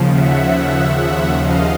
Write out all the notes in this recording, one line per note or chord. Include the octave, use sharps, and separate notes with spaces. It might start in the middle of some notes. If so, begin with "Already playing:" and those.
Already playing: D#2 C#3 F3
E5 F#5
E5 F#5
E5 F#5
D#5 F5